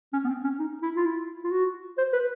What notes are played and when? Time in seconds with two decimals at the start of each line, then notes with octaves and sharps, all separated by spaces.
0.13 C#4
0.25 B3
0.29 C4
0.44 C#4
0.59 D#4
0.83 E4
0.96 F4
1.06 E4
1.44 F4
1.51 F#4
1.98 C5
2.13 B4